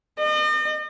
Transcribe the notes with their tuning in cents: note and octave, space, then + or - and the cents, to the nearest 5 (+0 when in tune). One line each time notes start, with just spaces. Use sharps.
D#5 -40